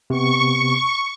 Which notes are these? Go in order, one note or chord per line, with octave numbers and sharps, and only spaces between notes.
C3 B3 C#6